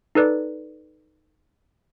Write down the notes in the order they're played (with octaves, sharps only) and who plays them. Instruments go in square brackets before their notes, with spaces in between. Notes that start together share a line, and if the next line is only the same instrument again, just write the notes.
[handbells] D#4 A4 B4 D5